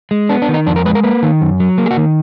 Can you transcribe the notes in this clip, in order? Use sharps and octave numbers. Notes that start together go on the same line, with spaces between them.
G#3
B3 D4
D4
D#3
D#4
F2 D4
A#4
G#3 B4
A#4
A#3 B4
D#3
F#2
F#3
A#3
G#4
F#4
D#3